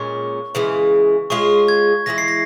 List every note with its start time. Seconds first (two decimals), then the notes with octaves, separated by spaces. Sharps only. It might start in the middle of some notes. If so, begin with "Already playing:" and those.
Already playing: A#2 G#3 C#4 C#6
0.55 C#3 E3 G#3
1.30 G#3 C#4 F4 G#4 C#6
1.68 G#6
2.06 E3 G#3 E4 A#6
2.18 C7
2.28 A#6